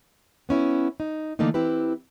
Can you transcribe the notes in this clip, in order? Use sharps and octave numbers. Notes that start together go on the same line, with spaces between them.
B3 C#4 E4
D#4
D3 E3 A3 A#3 D4 D#4
C4 E4 G4 B4